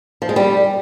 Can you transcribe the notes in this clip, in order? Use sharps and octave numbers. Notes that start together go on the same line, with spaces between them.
F3
G#3
G3